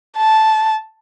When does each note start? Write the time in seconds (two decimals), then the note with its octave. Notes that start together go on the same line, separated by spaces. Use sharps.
0.17 A5